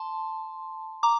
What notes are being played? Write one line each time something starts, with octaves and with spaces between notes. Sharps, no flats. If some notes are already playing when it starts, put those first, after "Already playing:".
Already playing: A5 C6
A#5 D6